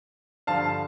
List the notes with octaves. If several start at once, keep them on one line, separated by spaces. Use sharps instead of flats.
G2 D3 F3 F5 A5